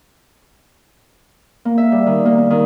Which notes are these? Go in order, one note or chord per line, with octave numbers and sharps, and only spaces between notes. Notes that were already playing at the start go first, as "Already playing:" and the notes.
A#3
E5
G3
D#3
A#3
A#3
D#3